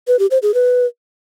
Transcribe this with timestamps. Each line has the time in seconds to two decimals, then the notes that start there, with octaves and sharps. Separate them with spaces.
0.07 B4
0.19 G4
0.31 C5
0.42 G#4
0.54 B4